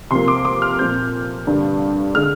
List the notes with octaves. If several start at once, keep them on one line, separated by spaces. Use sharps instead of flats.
C3 F3 A#3 C6
D6
D6
F6
A#2 F3 C4 G6
G2 D3 G3 D4
D3 G#3 F6